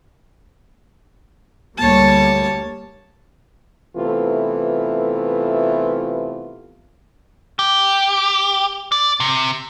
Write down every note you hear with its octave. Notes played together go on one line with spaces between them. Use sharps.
D2 G3 A#3 C#5 A5
C3 E3 A3 B3 F4
G4
D5
C3